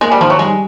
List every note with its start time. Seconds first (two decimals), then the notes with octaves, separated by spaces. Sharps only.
0.01 G#3 A#3
0.11 G3
0.21 D#3 F3
0.30 F#3
0.39 G3 G#3